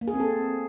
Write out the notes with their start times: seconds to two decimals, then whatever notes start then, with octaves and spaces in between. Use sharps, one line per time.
0.01 A#3
0.08 G#4
0.14 C4
0.20 A4